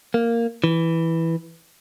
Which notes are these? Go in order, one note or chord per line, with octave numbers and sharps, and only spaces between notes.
A#3
E3